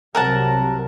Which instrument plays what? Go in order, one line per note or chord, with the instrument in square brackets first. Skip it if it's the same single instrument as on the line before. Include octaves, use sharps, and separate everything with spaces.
[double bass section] C2 C3 F#3 [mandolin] A#4 F#5 A5